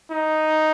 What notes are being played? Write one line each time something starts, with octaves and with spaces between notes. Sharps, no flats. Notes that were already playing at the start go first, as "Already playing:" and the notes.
D#4